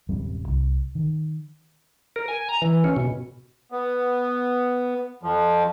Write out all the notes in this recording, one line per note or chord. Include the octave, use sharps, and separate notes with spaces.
D1 F#2 G3 C4
C2
D#3
A#4
G#5
A#5
E3
C#4
B2
B3
F2 F3